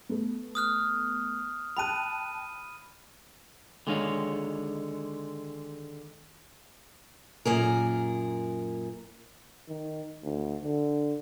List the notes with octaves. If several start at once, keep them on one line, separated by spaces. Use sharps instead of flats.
A3 B3
D#6 F6 F#6
G5 A5 B5 F#6 D#7
D3 D#3 G#3 C#5 D#5 F5
F#2 A#2 G#4 A#4
D#3
D2
D3